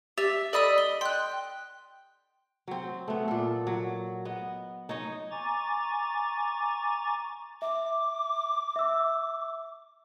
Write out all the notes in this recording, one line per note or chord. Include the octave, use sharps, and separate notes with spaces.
G4 E5 A6 F7
A4 D5 D#5 B5 E6
G7
G5 C6 F#6
F#3 C4
A3 B3
A#2 A4
F#3
B3 D#5
D#4 C#5 D#5
G#5 A#5 C#6 D6 A6
E5 D6
E5 E6